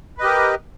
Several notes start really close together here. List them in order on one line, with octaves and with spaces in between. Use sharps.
B4 D#5 G4 A#4